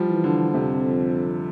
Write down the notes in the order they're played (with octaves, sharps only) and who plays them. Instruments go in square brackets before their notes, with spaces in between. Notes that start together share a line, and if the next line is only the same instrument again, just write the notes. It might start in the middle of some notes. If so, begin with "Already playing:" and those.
Already playing: [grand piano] F3 G3
[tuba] E3
[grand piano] D3
[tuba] F2 [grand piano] C3